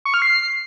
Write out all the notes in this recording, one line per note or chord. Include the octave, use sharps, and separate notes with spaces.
C#6
F6
C7